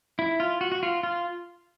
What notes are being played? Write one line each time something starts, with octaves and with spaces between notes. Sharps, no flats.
E4
F4
F#4
F#4
F4
F4